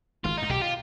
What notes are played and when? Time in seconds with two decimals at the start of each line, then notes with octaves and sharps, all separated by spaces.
0.24 G#1 G#2 F4
0.37 G#2 D#4
0.49 B1 B2 G4
0.61 F4